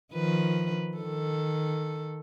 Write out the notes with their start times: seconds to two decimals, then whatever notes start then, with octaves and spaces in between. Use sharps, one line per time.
0.13 D#3 F3 B4
0.98 D#3 A4